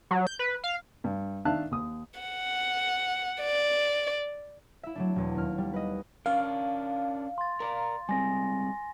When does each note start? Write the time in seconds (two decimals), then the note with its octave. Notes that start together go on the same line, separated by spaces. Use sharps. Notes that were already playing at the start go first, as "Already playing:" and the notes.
0.11 F#3
0.27 G6
0.39 B4
0.64 F5
1.04 G2
1.45 D#3 D4 E5 F5 A5 F#6
1.71 D#2 D#6
2.20 F#5
3.41 D5
4.83 E4 E5
4.95 F#3 A3 D4
5.16 E1 E2
5.35 D#2 F6
5.58 G3
5.73 B4 D#5
6.26 C#4 D4 A#4 F5
7.38 C6 A6
7.60 A#4 D5 A#5
8.09 G3 G#3 C4 G#5 A#6